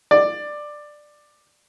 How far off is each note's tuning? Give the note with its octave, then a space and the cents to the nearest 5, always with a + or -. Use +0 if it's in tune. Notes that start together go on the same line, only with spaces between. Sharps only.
D5 +15